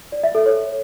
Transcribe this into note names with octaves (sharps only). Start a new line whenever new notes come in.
D5
E5
A4
C#5